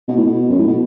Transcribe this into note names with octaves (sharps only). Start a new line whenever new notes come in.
B2
A2
B2
F#2
A2
B2